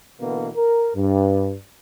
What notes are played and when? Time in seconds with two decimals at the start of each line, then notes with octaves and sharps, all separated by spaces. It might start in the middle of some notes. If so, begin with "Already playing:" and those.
0.21 B2 D3 E3 A#3 B3
0.57 A#4
0.96 G2